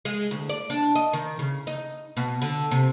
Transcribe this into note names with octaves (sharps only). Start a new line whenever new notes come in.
G#3
D2
D5
D4
D#5
D#3
C#3
D#4
B2
D3
C3